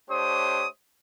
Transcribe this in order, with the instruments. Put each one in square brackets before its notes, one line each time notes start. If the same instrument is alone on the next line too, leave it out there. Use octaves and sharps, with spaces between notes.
[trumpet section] A3 D4 G4 C5 C#5 D#6